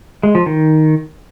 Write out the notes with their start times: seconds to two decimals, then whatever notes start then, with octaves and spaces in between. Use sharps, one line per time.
0.23 G#3
0.35 F3
0.46 D#3